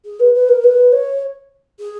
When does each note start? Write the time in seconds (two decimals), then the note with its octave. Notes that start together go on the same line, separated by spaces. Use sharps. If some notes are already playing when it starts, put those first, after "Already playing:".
0.05 G#4
0.20 B4
0.34 B4
0.49 A#4
0.64 B4
0.92 C#5
1.79 G#4